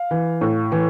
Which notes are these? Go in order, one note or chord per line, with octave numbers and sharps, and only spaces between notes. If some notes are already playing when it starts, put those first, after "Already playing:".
Already playing: F5
E3
A2
E3